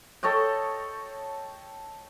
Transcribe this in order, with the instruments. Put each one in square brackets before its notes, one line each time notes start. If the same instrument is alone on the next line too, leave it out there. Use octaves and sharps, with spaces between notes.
[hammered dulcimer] A4 C#5 D#5 G5